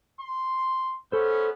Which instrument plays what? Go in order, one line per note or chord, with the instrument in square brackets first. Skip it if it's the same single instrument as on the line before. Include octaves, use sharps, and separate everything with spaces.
[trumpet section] C6
[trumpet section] G#3 B3 C#4 [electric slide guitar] A4 C5